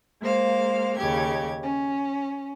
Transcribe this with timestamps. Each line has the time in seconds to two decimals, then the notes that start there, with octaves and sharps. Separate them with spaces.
0.20 G#3 A#3 C5 F5
0.97 D#2 C#3 G4 G#6
1.63 C#4